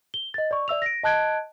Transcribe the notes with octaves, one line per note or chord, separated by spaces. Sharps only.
G7
D#5 A6
D5 C#6
D5 E5 E6 F7
A#6 D7
D#5 A5 F#6 G#6 D7